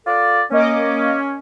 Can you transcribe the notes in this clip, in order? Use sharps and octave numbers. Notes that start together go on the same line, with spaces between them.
F4 A4 D5
A#3 C#4 D#5 D6